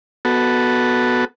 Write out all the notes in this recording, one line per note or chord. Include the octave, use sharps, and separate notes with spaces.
B3 F#4 A4